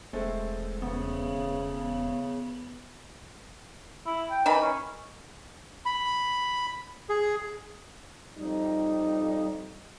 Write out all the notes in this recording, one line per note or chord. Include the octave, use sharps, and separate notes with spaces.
E1 G#3 A3 C4
C#3 B3
E4
G5
D#3 E3 B4 B5
C#4
B5
G#4
F2 G3 D#4